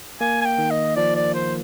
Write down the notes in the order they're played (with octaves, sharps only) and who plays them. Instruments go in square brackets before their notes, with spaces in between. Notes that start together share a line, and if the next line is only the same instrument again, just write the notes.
[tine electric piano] A#3 [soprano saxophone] G#5
[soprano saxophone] G#5
G5
[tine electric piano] D#3
[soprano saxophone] D#5
[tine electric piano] F3 [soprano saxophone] D5
[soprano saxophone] D5
C5